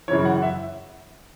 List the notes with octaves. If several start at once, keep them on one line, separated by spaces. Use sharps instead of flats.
F#2 C#3 E3 C#5
F#5
E5